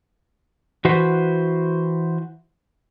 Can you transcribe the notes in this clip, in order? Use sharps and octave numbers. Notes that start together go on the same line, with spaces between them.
E3 F#4 B4 C5